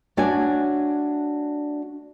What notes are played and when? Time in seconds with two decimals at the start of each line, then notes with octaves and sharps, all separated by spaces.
0.17 A3 D4 F#4 C#5 D5 G#5